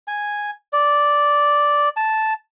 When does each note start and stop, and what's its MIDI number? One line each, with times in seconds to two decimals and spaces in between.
0.08 0.51 80
0.73 1.89 74
1.97 2.33 81